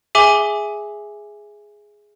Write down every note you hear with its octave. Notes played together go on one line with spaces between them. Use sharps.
G#4 E5 G#5 D6 G7